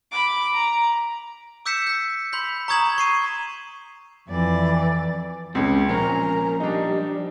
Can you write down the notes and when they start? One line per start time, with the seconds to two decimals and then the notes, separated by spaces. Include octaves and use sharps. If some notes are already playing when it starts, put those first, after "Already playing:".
0.11 B5 D6
0.53 A#5
1.66 D6 E6 G6 B6 C#7 E7
1.87 G6 B6
2.33 B5 C6 G6 B6
2.68 A#5 C#6 D#6 G#6 E7 F#7
2.98 C#6 C7 D#7
4.28 F2 E3 D5
5.55 C#2 C4 C#4
5.89 A#2 F3 C#4 A#4 C5 A#5
6.60 G3 D4 D#4